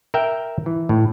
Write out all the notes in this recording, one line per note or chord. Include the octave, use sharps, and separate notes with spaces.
A#4 E5 G5
E3
A2